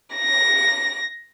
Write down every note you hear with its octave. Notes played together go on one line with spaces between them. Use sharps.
A#6